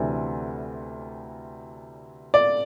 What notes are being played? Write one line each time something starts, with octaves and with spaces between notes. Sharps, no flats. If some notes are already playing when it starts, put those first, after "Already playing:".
Already playing: D2 C3 E3 D4
D5